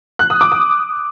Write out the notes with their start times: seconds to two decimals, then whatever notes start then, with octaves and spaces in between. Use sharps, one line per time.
0.19 F#6
0.30 D#6
0.41 D6
0.52 D#6